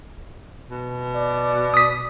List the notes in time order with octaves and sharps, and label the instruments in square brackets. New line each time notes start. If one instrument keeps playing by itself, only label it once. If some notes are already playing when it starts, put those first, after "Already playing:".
[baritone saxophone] B2
[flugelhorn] D5
[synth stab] D#6 B6